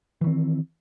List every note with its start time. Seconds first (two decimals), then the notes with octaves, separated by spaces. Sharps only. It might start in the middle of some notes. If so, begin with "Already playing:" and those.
0.21 E3
0.24 D#3
0.27 C4